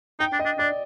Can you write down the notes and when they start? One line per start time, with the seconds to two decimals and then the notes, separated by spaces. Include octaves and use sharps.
0.20 D#4 G5
0.33 D4
0.39 D#5
0.45 D4
0.59 D4 D5